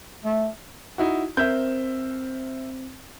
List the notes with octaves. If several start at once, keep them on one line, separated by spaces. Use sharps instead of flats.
A3
D#4 E4 F#4
C4 A#4 C5 E5 G6